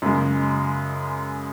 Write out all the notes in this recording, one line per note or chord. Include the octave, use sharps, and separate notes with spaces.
F#2 C#3 G#3